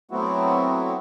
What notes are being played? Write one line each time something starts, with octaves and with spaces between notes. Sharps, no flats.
F#3 A3 B3 C4 E4 F#4